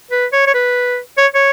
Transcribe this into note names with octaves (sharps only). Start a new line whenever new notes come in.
B4
C#5
C#5
B4
C#5
C#5